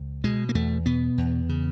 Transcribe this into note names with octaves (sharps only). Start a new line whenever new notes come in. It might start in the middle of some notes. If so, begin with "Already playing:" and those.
Already playing: C#2
B2 G#3
A#3
E2 A3
B2 B3
E2
C#3